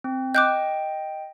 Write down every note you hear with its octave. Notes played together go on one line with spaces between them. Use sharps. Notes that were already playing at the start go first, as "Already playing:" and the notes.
C4
D#5 G5 D6 F#6 G6